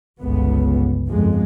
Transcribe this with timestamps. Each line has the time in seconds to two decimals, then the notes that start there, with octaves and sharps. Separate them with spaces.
0.21 G1 C#2 B3
1.09 G1 F2 G#3